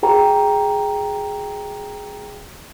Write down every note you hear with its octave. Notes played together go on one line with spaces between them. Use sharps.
F#4 G#4 G5 A#5